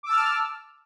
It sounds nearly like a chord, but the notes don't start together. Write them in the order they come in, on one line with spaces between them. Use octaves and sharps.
D6 E6 A5 F6